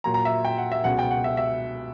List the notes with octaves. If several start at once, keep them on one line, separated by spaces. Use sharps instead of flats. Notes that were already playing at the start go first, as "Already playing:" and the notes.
A#2 F#3 A#5
A#5
E5
G5
F#5
E5
C#2 B2 F#3 F#5
G5
F#5
E5
E5